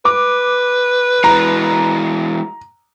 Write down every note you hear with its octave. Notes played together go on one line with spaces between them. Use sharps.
B4 D6
E3 G#3 A#5